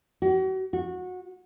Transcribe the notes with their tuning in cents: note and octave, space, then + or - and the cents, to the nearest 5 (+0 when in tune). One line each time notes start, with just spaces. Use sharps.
F#4 +40
F#4 -20